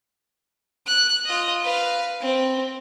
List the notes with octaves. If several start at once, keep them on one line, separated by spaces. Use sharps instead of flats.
F#6
F4 D#5
B4 F5
C4